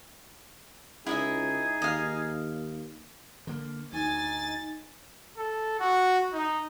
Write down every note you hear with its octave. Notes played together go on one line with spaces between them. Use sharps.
C#2 D#4 E4 G#4 D#5 E5
D#2 D#5 F5
D3 A#3
D2 D#4 G#5 A6
A4
F#4
D#4